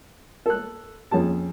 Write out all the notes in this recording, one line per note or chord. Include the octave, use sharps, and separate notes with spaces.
A4 F#6
F2 C#4 G#4 A5